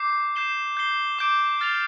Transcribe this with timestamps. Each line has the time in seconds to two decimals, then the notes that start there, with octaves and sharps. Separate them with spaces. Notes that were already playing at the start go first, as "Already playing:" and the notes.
Already playing: D6 G6 C7
0.36 G6 C7 E7 G7
0.77 G6 C7 G7
1.19 D6 G6 D7
1.61 F6 A6 C7 F7